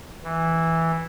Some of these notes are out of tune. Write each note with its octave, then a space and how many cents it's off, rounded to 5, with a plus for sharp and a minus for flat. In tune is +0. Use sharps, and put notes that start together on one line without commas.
E3 -5